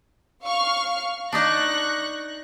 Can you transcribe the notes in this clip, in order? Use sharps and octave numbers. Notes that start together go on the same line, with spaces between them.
F5 C#6 F6
D4 D#4 D5 C#6 F#6 A#6